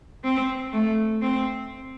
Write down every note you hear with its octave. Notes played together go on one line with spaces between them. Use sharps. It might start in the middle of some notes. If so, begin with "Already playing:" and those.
C4
A3
C4